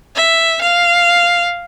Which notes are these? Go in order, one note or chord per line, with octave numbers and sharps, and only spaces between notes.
E5
F5